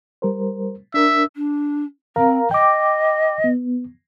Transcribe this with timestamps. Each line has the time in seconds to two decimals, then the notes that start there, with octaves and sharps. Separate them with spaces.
0.22 G3 A#4 C5
0.94 D4 A#4 E5
1.34 D4
2.16 C4 A#4 F5 A#5
2.51 D#5 G5 D6
3.44 B3